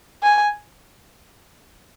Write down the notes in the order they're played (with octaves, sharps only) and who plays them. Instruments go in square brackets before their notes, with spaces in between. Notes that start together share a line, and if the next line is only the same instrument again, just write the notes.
[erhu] G#5